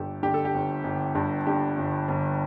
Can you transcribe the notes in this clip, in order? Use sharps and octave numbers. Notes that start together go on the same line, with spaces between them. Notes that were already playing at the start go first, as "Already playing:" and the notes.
Already playing: G1 G2 G4 A4
D3 G4
A4
G4
G1
G1
G2
D3 G4
G1
G1